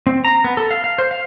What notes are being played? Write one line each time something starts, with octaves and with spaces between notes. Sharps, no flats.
C4
A#5
B3
A4
F5
F5
C5
F5